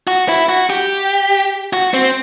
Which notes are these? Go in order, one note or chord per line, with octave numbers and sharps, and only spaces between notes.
F#4
E4
F#4
G4
F#4
C4